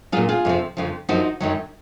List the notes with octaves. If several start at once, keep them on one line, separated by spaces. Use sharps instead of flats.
A#2 F#3 F4 G#4
F4 G#4
F2 C3 F3
F2 C#3 F3
F#2 F3 D#4 F#4
F#2 D#3 F#3